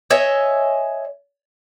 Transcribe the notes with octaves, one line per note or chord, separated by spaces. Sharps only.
C#5 D#5 E5 G#5